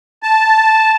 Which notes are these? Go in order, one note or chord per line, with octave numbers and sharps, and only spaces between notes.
A5